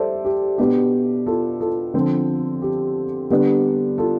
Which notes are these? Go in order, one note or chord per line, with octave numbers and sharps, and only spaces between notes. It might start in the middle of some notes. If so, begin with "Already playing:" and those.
Already playing: G3 A4 C5 D5 E5
G4
B2 B3 D4 G4
F4 A4
F4 A4
D3 F3 C4
G4
D3 G3 B3 D4 G4
F4 A4